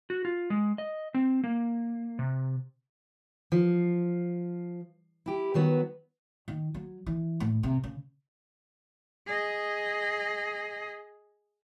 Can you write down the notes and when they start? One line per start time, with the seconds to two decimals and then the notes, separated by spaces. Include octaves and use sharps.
0.10 F#4
0.25 F4
0.50 G#3
0.78 D#5
1.14 C4
1.44 A#3
2.19 C3
3.52 F3
5.26 E4 G4
5.54 D#3 F#3 B3
6.48 D#3
6.74 F#3
7.06 E3
7.40 A2
7.63 C3
7.84 C#3
9.27 G#4 D#5